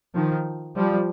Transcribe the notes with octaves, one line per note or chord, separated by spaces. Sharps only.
D#3 F3
F3 G3